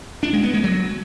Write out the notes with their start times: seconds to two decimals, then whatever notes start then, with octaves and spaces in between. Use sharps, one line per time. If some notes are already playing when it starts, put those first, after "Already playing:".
0.23 D4
0.33 G#3
0.43 B3
0.54 G#3
0.64 F#3